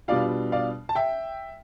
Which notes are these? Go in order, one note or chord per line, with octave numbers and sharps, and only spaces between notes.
B2 G3 D4 F4 D5 F5
D5 F5
A5
E5 G5